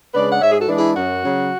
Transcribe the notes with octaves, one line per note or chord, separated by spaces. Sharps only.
C#3 G#3 D4 B4 D5
F#5
G#2 C#5 E5
G#4
F#4 A4
E3 G#3 D4
E4 G#4
F#2 F#4
C#3 F#3 C#4